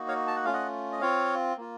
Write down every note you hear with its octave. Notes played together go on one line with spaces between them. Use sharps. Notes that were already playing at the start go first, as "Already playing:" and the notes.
Already playing: A#3 D#4 F#4
C#5 F5
A5
F#5
A3 C#4 F4 F5
D#5 F#5
D#5
C4 F4 C#5 F5
A#3 F4